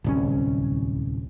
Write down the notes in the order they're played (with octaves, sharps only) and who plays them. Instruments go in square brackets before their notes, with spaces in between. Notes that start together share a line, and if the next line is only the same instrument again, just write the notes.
[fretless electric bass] D1 C2 C#4